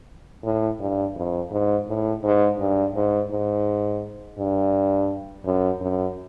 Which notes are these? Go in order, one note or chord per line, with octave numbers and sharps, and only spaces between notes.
A2
G2
F2
G#2
A2
G#2
G2
G#2
G#2
G2
F#2
F#2